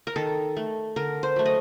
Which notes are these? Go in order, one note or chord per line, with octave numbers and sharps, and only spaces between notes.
A#4
D#3 A4
A3
D3 A#4
C5
F#3 A3
D#5